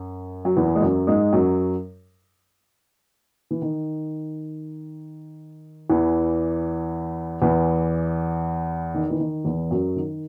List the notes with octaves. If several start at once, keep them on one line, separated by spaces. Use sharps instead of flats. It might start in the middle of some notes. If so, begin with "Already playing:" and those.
Already playing: F#2
F#3
E2 E3
G#3
F#2 F#3
G#2 G#3
F#2 F#3
E3
D#3
E2 E3
E2 E3
D#3
E3
D#3
E2 E3
F#2 F#3
D#3